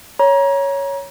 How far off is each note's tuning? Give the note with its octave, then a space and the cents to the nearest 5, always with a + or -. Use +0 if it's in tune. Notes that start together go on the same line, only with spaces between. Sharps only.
C#5 +5 A#5 +30